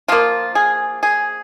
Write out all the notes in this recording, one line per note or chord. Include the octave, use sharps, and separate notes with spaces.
F3 A#3 F4
G#4
G#4